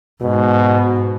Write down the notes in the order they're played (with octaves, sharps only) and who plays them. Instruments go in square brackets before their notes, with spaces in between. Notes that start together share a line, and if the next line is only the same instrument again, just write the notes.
[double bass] G#2 [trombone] B2